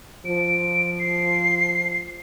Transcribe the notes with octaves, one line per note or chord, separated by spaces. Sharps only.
F3 D7
C7